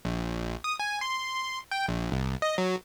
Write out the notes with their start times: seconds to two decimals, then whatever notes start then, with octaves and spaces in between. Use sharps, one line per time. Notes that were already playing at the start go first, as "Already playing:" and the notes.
0.05 A#1
0.64 D#6
0.79 G#5
1.01 C6
1.71 G5
1.88 A#1
2.12 C2
2.42 D#5
2.58 F#3